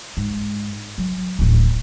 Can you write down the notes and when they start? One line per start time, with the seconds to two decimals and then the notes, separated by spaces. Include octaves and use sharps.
0.17 G#2
0.98 F#3
1.39 D1 A1